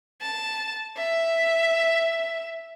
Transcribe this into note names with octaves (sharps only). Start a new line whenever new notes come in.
A5
E5